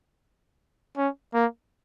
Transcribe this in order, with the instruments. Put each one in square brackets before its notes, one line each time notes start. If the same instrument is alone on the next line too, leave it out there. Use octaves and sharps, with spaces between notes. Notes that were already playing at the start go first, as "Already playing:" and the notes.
[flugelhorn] C#4
A#3